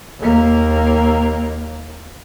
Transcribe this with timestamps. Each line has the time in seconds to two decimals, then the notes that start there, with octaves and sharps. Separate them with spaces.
0.19 D#2 A#3